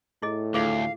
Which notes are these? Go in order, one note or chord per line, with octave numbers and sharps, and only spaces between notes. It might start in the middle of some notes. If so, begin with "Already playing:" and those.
A2 E4 G#4 D#5
D2 F4 G#4 F5